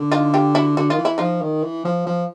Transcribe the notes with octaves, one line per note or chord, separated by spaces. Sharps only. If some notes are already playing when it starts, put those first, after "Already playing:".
Already playing: D3
D#4 F4
F4 G4
E4 F#4
D3 F#4
D#3 F4
E3
E4
F3 D#4 F4
D#3
E3
F3
F3